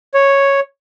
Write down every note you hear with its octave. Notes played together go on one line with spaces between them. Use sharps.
C#5